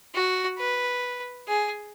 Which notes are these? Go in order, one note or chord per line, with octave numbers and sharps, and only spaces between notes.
F#4
B4
G#4